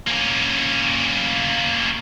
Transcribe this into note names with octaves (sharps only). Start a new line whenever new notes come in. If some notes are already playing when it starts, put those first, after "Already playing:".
A#3 C#4